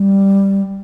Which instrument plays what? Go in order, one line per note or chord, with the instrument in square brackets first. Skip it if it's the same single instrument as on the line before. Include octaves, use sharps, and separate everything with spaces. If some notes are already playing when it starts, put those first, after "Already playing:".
Already playing: [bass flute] G3